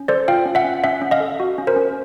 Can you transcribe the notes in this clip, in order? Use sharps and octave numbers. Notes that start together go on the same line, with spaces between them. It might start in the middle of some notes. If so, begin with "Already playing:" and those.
Already playing: C#4
A4 C5 D5
F4 F5 G5
C#4
E5 F#5
C#4
C#4 E5 F#5
C#4
D#5 F5
A4
F#4
C#4
A#4 C5
C#4